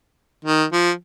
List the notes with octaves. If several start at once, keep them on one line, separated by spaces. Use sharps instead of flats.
D#3
F3